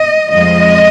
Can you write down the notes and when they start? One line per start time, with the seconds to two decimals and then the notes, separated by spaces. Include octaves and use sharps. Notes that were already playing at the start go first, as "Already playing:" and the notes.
Already playing: D#5
0.31 F2 F3 G#3 D#5